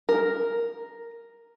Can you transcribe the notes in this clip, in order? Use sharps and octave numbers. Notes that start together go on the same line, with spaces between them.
A#4